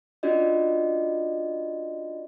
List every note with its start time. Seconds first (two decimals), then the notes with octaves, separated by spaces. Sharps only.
0.23 C#4 D4 F4 F#4 D5 D#5